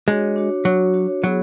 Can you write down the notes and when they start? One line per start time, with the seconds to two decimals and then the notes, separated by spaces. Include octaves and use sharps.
0.07 G#3 D4 F#4 C#5
0.36 D4 F#4 C#5
0.65 F#3 D4 F#4 C#5
0.94 D4 F#4 C#5
1.23 F#3 B3 E4 G#4